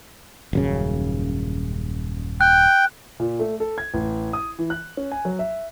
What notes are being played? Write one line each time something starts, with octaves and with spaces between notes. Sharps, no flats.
D#1 F#2 C#3
G5 F#6
A#2
A3
A4
G#6
A1
D#6
E3
F#6
C#4
G#5
F#3
E5